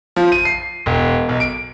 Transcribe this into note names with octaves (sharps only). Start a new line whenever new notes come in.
F3
D#7
C7
E1
B1
D7